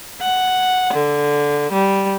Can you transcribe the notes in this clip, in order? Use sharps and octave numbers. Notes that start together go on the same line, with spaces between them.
F#5
D3
G3